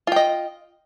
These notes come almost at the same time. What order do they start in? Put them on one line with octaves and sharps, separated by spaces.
F4 G5 D#5